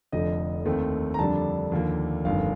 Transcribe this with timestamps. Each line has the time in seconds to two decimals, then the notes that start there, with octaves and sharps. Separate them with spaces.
0.12 F1 F2 D3 F3 D#5
0.65 D#2 D#3 A3 C4 D#4
1.14 A#5
1.19 F2 D3 G3 D4 A5
1.72 D#2 D3 F3 A#3
2.25 G1 F2 D#3 F5